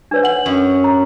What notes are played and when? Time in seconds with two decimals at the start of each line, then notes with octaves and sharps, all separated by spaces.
0.11 D4 B4 C#5
0.24 F#5 F#7
0.46 F#2
0.84 A#5